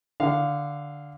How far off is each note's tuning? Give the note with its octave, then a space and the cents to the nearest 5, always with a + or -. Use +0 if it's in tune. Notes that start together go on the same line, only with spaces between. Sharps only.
D3 +0 F5 +0